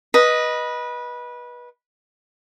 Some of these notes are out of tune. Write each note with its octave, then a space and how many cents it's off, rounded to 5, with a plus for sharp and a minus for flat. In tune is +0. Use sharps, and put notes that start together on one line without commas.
B4 -20 D#5 +0